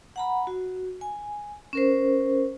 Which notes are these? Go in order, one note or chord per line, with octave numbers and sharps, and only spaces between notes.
F#5 A#5 B5
F#4
G#5
C#4 A#4 C5